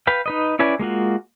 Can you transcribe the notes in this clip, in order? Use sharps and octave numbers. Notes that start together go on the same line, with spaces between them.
B4 F5 G5
D#4 B4 D#5
C#4 E4 B4 D5 G#5
G#3 A#3 F4 F#4